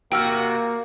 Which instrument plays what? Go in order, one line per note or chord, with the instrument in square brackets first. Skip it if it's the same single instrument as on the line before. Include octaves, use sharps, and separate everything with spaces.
[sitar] C3 F#4 [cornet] A#3 [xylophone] G5 E6 F6